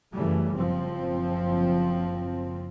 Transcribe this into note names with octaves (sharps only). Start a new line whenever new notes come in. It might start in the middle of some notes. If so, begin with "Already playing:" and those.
F#2 C#3 E3 G3 A3
F#1 F3 C4